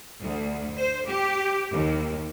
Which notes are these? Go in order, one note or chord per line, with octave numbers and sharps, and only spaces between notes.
D2
C5
G4
D#2